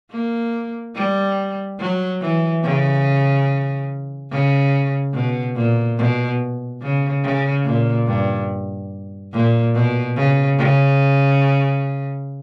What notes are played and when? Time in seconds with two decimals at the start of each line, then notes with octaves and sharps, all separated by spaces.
0.12 A#3
0.96 G3
1.80 F#3
2.21 E3
2.63 C#3
4.31 C#3
5.14 B2
5.56 A#2
5.98 B2
6.82 C#3
7.23 C#3
7.65 A#2
8.07 G2
9.33 A#2
9.75 B2
10.16 C#3
10.58 C#3